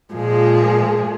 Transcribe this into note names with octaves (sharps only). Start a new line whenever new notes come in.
A#2 F3 G#3 G#4